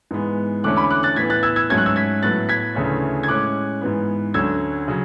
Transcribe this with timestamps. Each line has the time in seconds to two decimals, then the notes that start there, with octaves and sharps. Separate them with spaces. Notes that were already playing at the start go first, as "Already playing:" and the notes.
0.11 G#2 E3 G#3 B3
0.64 E2 D3 A3 C#4 D6 F#6
0.77 B5 D6
0.90 D6 F#6
1.03 F#6 A6
1.16 A2 E3 B3 G#6 B6
1.30 F#6 A6
1.43 E6 G#6
1.56 E6 G#6
1.70 G#2 F#3 A3 C#4 G#6
1.78 F#6
1.86 E6 G#6
1.96 G#6 B6
2.23 A2 F#3 B3 F#6 A6
2.49 G#6 B6
2.75 D2 C#3 E3 A3 C#4
3.23 G#6
3.28 A2 G#3 C#4 D6 F#6
3.81 G#2 E3 B3
4.34 D2 D3 F#3 C#4 E6 G#6
4.88 C#3 F#3